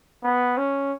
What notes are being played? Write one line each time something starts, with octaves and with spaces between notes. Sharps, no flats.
B3
C#4